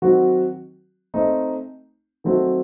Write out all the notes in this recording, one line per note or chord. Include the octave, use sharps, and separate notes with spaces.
D#3 F#3 C4 F#4
A3 C4 D#4
D#3 F#3 A3 C4 F#4